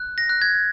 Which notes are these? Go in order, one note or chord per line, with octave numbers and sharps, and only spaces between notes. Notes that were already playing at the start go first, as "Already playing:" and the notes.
Already playing: F#6
A#6
F#6
G#6